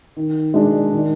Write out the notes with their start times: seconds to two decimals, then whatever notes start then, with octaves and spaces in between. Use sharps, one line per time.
0.16 D#3
0.54 G#3 D4
0.92 D#3